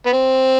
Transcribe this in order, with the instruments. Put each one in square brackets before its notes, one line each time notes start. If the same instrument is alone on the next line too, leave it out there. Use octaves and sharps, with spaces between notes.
[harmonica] B3
C4